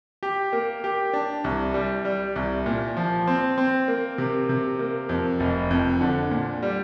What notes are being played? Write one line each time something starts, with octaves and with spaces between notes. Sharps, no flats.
G4
A#3
G4
D4
C2
G3
G3
C2
A#2
F3
C4
C4
A#3
C3
C3
A#3
F2
F1
F2
D3
A#2
G3